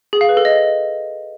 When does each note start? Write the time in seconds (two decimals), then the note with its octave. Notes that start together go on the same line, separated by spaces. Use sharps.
0.13 G#4
0.21 F5
0.29 B4
0.37 A4
0.45 D#5